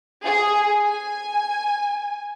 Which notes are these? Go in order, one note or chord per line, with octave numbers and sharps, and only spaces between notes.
G#4
G#5